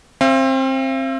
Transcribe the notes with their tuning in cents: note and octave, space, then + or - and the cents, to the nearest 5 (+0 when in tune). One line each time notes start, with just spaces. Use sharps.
C4 +25 F5 -45